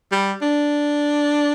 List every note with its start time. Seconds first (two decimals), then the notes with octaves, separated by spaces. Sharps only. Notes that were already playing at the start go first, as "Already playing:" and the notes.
0.12 G3
0.42 D4